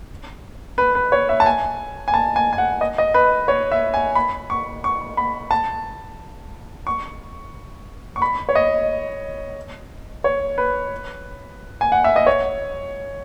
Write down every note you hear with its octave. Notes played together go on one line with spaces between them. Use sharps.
B4
B4
C#5
E5
A5
G#5
G#5
A5
G#5
G#5
F#5
D#5
D#5
B4
C#5
E5
G#5
B5
C#6
C#6
B5
A5
C#6
C#6
B5
C#5
D#5
C#5
B4
G#5
F#5
E5
D#5
C#5